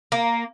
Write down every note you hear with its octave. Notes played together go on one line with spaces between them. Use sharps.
A#3